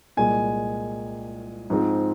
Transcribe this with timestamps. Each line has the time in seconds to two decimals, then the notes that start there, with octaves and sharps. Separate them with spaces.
0.17 C2 A#2 G#3 G#5
1.70 G#2 F3 C4